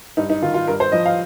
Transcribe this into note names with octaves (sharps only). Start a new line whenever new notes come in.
G2 D#4
D#4
D#3 F4
F4
G2 A#4
C5
F3 D#5
F5